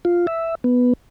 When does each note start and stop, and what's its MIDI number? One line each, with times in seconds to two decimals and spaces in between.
0.05 0.26 65
0.27 0.55 76
0.64 0.93 59